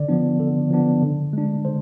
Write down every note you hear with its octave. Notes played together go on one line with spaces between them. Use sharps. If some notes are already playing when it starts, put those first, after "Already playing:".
Already playing: D3 D5
F3 B3 D4
D3
F3 B3 D4
D3
G#3 D4
D3 C5